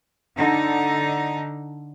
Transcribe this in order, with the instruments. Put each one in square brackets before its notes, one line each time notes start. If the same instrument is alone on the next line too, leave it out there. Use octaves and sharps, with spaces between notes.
[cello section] D3 D#4